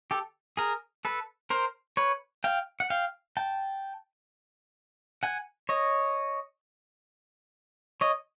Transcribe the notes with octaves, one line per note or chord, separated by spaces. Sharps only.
G4 A4
G#4 A#4
A4 B4
A#4 C5
B4 C#5
F5 G5
F#5
F5 G5
G5 A5
F#5 G#5
C#5 D#5
C#5 D#5